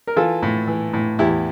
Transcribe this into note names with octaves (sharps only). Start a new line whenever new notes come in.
A#4
E3 F4 A4
A2
E3
A2
E2 E4 G4